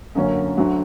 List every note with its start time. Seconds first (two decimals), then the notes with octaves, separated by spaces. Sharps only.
0.15 F#2 D3 F#3 A#3 C#4
0.57 D2 D3 F#3